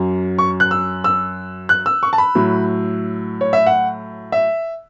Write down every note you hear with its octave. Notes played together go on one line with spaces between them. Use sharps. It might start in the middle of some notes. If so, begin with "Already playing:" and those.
Already playing: F#2 F#3
C#6
F#6
E6
E6
F#6
E6
C#6
A5
B5
A2 F#3
C#5
E5
F#5
E5